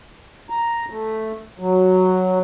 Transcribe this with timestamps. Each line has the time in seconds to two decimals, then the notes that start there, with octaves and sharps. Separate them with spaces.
0.50 A#5
0.90 A3
1.59 F#3